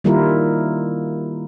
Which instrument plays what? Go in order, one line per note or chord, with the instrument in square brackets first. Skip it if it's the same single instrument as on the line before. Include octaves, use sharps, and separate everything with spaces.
[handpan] D#3 G3 A#3 E4 F4 A#4